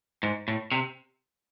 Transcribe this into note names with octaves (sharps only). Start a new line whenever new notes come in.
G#2
A2
C3